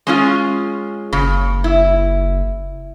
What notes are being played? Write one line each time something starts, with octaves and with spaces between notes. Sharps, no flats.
G#3 C#4 F4
F#1 C#3
E4